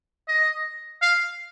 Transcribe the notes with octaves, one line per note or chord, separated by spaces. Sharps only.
D#5
F5